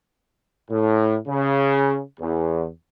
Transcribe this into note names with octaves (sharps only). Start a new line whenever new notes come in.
A2
C#3
E2